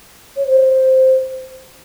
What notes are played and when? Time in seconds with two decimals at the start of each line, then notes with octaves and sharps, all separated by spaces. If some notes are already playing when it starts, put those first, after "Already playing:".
0.37 C#5
0.47 C5